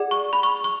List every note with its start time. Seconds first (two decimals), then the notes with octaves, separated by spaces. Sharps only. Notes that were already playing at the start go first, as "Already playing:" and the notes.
Already playing: G#4 D5 F#5
0.11 C#6
0.33 B5
0.43 C#6
0.64 C#6